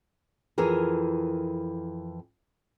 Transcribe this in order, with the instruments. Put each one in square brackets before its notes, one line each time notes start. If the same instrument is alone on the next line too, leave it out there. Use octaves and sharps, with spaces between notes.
[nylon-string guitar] F2 E3 G#4 A#4